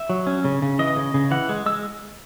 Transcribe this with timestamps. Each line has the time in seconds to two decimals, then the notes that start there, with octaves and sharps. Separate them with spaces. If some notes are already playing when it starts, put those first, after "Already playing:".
Already playing: E5
0.10 F#3
0.27 C#4
0.45 C#3
0.62 C#3
0.79 E3 D#5
0.96 C#3
1.14 C#3
1.31 E3 F#5
1.49 G#3
1.66 G#3 E6